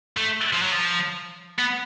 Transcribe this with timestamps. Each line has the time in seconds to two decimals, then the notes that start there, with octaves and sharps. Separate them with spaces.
0.17 A3
0.53 F3
0.62 F#3
0.72 F3
1.58 B3